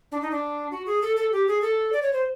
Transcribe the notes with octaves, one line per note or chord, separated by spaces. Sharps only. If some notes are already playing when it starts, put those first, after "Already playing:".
D4
D#4
D4
F#4
G#4
A4
A4
G4
G#4
A4
D5
C#5
C5